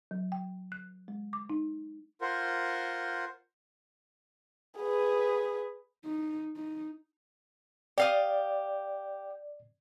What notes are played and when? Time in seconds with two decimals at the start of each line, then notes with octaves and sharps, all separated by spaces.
0.11 F#3
0.32 G5
0.72 F#6
1.08 G#3
1.33 D6
1.50 D#4
2.21 F4 A#4 C5 F#5
4.79 G#4 B4
6.05 D#4
6.56 D#4
7.98 G4 D5 F5 D#6